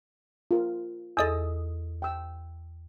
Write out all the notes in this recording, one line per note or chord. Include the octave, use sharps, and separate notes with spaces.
F4 A#4
E2 A4 D#5 D#6 E6 A6
G5 E6